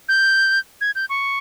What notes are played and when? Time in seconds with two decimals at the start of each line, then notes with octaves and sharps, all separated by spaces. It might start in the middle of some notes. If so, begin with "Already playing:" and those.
0.09 G6
0.81 G#6
0.95 G6
1.09 C#6